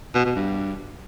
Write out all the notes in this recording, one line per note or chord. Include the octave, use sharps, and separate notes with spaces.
B2
B2
G2